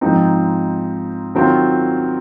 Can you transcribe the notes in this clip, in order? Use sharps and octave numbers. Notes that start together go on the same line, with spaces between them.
G#2 F3 C4 D#4
D#3 F#3 C4 F4